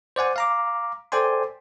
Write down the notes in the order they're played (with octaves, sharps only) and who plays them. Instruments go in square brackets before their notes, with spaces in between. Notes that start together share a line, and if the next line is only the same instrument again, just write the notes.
[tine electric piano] C5 D5 F#5 G#5
F5 A#5 D6
A4 C5 D5 G5 G#5 C6